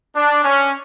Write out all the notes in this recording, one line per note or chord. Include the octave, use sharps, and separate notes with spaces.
D4
C#4